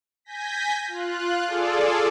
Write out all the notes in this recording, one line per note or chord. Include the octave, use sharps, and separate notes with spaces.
G#5 G6 A#6 B6
F4 F#6
F4 G#4 A4 D5